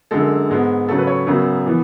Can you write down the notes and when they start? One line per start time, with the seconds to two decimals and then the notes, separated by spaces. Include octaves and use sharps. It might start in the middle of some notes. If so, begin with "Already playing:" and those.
0.11 F#2 D3 G#3 A4
0.50 G#2 G#3 B3
0.89 C#3 F#3 A3 A4
0.98 B4
1.07 C#5
1.27 F#2 C#3 F#3 B3
1.66 E3 B3